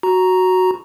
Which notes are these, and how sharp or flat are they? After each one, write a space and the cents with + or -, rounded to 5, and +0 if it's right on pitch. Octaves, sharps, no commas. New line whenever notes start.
F#4 +0 A#5 +5